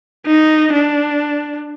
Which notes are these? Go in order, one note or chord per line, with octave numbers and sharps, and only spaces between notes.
D#4
D4